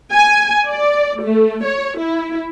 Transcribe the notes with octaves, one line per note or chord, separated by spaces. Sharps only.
G#5
D5
A3
C#5
E4